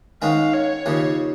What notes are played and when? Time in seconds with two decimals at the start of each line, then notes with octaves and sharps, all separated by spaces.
0.22 G#2 D#3 G#3 C#4 F5
0.54 C#5
0.86 D#2 C#3 F3